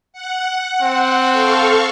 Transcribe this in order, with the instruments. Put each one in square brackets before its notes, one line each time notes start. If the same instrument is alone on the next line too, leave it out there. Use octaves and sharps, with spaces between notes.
[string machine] F#5
[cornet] C4
[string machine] A4 F5 C#6